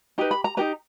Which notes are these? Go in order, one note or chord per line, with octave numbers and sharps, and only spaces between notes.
D#4 G4 B4 A#5
B5
A#5
D#4 G4 B4 A#5